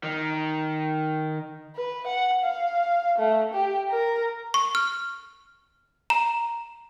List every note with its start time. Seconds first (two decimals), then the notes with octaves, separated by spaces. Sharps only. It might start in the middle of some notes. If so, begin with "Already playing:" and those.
0.04 D#3
1.75 B4
2.07 F#5
2.43 F5
3.18 A3
3.54 G4
3.90 A#4
4.54 C#6
4.75 F6
6.10 A#5